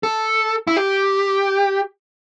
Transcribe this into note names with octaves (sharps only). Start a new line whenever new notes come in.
A4
E4
G4